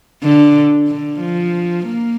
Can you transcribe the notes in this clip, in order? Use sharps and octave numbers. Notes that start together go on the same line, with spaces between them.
D3
D3
F3
A#3